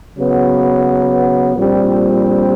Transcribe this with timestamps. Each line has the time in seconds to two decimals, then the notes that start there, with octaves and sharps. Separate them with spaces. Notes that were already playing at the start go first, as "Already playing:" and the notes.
0.18 C#3 F#3 B3
1.55 A#1 A#2 G3 C4